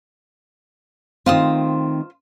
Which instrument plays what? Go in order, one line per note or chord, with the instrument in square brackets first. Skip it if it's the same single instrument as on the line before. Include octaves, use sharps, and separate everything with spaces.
[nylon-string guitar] D#3 A3 C4 [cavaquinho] F4 C5 D#6